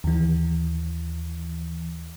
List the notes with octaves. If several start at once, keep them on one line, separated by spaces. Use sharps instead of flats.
D#2 E3